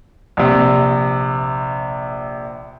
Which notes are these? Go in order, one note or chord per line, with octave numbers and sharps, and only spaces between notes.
A#1 C3